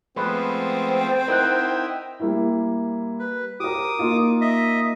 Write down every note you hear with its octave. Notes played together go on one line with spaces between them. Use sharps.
F3 G#3 A3 B3 C4 B4
G5
D#4 E4 A#4 C5 F#5
G3 A#3 E4
B4
G4 A#4 D6 D#6
A#3 D#4 F4
D#5 E5